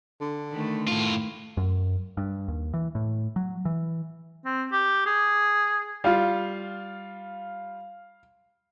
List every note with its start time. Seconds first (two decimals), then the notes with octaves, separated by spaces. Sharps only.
0.21 D3
0.52 D#3 A3 B4
0.88 A2 F4
1.57 F#2
2.17 G2
2.48 D#2
2.74 E3
2.95 A2
3.36 F#3
3.65 E3
4.45 C4
4.72 G4
5.06 G#4
6.04 G3 F4 F5